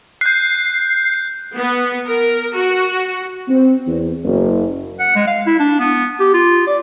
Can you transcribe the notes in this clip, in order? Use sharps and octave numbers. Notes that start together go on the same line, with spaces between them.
F#6 G6 C7
B3
A#4
F#4
C4
E2
F#1
F#5
G#3
F5
E4
D4
B3
G4
F4
D5